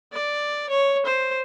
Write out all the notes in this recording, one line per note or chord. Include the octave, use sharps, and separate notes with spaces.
D5
C#5
C5